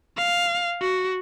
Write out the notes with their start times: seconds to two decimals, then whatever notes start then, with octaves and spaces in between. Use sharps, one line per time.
0.17 F5
0.81 F#4